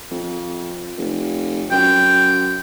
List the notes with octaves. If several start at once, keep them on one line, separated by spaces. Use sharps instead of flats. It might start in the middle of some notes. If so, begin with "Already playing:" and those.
F2
F1
F#2 G5